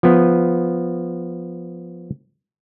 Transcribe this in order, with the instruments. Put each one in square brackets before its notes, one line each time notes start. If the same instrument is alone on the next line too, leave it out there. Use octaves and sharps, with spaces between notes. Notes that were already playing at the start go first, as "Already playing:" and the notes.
[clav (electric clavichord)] F3 B3